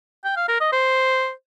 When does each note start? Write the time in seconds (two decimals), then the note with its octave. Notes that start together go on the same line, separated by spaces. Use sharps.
0.25 G5
0.37 F5
0.49 A#4
0.60 D#5
0.72 C5